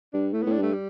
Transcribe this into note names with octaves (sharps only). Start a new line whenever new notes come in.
G2 D4
A2 A3
B3
A2
D4
G2 A3
G3